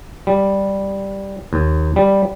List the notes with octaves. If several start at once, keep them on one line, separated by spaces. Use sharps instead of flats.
G3
D#2
G3